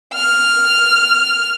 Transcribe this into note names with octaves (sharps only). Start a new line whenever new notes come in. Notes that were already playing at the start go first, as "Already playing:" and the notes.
F6